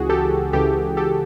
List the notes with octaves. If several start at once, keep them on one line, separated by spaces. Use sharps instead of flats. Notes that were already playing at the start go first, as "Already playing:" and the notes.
Already playing: C#2 C#3 E3 F#4 G#4
G4 A4
C#2 C#3 E3 G4 A4
G4 A4